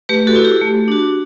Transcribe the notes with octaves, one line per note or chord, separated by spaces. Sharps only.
A3 G4 B4
F#4 A4
E4
G4
A3
D4 F#4